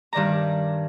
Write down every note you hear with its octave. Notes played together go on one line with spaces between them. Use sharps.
G2 D#3 D5 A#5